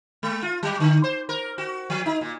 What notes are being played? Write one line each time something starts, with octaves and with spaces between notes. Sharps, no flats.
G#3
F4
F#3
D3
C5
A#4
F#4
F3
D#4
A#2